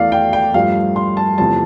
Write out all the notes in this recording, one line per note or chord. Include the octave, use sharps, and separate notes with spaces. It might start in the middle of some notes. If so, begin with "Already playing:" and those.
Already playing: E2 E3 A3 D5 F5
G5
G5
G2 F3 A3 F5
C6
A5
E2 C3 F3 A3 A5